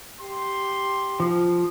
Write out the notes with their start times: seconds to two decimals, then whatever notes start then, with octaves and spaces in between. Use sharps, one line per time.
0.20 G4 C6
1.20 F3